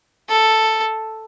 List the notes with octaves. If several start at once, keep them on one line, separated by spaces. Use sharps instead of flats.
A4